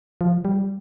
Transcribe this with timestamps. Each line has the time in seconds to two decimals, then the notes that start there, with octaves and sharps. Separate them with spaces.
0.21 F3
0.45 G3